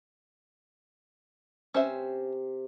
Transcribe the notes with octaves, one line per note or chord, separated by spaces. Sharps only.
C3 C#4 C5 E5